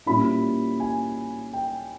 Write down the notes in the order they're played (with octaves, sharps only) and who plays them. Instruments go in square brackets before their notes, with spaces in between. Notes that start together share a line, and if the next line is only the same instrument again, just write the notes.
[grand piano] A#2 G3 C#4 E4 B5
G#5
G5